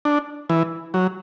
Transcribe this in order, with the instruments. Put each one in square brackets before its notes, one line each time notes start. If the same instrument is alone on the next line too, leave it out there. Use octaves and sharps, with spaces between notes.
[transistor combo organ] D4
E3
F#3